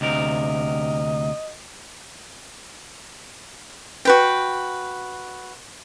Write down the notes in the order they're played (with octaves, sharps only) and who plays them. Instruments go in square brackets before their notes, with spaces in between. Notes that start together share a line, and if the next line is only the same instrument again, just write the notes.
[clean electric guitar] D2 C3 A#4 [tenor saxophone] D#5
[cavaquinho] F#4 B4 G5